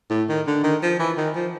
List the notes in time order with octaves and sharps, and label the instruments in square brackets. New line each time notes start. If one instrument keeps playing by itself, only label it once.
[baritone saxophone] A2
D#3
D3
D#3
F3
E3
D#3
F3